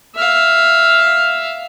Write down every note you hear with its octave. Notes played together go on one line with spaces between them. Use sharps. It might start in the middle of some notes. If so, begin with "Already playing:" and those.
E5 F5